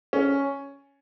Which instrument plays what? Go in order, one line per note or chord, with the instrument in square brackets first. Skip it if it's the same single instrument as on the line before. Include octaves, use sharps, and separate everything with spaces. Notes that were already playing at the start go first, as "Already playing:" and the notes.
[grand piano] C#4